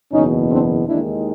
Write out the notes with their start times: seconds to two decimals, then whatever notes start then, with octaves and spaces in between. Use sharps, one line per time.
0.13 F#1 E2 B2 C#4 D#4
0.51 C4 D4
0.87 D#2 D#3 G#3 D4 E4